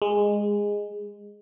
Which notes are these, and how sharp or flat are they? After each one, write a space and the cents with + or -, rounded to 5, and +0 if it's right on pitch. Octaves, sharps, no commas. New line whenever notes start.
G#3 -10